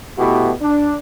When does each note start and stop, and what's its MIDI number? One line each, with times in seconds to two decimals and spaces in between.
0.18 0.52 47
0.18 0.52 57
0.18 0.52 59
0.18 0.52 64
0.18 0.52 66
0.18 0.52 67
0.62 0.97 62